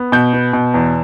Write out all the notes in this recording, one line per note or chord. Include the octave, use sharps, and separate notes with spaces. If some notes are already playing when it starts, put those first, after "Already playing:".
Already playing: B3
B2 G6
B3
B2
E2